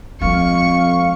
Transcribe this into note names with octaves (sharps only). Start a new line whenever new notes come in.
F2 F3 G#3 F5 C#6